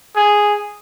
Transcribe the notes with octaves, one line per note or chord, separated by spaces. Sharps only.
G#4